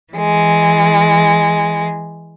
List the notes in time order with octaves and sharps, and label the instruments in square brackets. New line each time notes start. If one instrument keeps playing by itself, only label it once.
[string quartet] E3 G#3